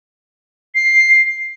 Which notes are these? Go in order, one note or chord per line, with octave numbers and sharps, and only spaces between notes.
C7